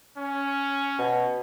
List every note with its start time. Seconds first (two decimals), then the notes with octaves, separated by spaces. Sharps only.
0.18 C#4
0.99 B2